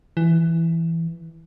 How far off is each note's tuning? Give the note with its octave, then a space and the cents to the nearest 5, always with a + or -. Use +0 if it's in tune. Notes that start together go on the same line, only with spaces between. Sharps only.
E3 +5